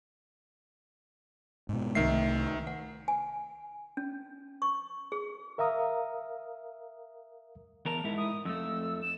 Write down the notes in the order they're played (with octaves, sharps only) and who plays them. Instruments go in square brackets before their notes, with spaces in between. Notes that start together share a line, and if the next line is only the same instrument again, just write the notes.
[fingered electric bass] G#2 B2
[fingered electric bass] C2 A3 [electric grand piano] D#3 E5 C7
[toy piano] F#5
G#5
C#4
C#6
G#4
[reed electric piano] A#4 E5 F5 A#5 D#6
[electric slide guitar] E2 A#4 A5 [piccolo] F7
[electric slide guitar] G#2 E4
[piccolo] D#6
[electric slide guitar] F2 A3 [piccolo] E6
[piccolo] E7